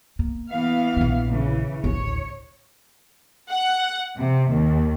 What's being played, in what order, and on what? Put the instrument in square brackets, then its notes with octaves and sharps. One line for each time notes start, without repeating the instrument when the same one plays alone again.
[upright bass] A#3
[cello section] E3 B3 F5
[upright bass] A#1 D#3
[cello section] C#3 E3
[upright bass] A1 D2 [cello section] C#5
[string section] F#5
C3
D#2